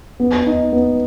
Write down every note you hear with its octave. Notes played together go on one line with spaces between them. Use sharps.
B3
D#4
B3